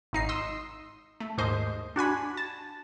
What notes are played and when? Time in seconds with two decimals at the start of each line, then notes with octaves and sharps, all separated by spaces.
0.13 G#1 D#4 C7
0.29 C6 D#6 E6
1.20 A3
1.37 D#2 G#2 C5 D#5
1.96 D4 F#4 G#5 B5
2.37 A5